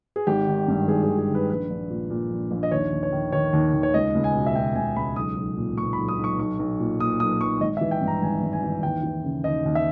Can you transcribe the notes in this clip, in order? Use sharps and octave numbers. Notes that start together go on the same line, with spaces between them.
G#4
G#1 G4
D#3
G2
G#1 G#4
G#4
G#1
G#4
D#3
B4
A#1 B4
A#1
A#2
A#2
A#1
A#1
D#5
D#2 C#5
D#2
C#5
D#3
D#3 C#5
D#2
D#2
C#5
C#2 D#5
C#2
G#5
B2
E5
B2 G5
C#2 G#5
C#2 B5
B1 D#6
B1
A#2
A#2 C#6
B5
B1
D#6
B1
C#6
B1 C#6
B1
A#2
A#2 D#6
B1 D#6
B1 C#6
G#1 D#5
E5
E3
G5
G2
A#5
G#1 G#5
G#1
G#5
E3
D#2 G5
E3
C#3
D#2 D#5
D#2
E5